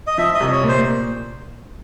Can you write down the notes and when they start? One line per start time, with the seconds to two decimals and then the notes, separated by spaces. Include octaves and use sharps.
0.07 D#5
0.18 F3 E5
0.34 D#5
0.40 C2
0.52 C#5
0.63 A#2
0.68 C5